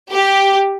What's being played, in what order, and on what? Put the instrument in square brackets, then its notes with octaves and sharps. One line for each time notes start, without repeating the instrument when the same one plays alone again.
[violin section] G4